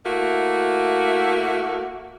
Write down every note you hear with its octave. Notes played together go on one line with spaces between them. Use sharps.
A3 A#3 E4 F#4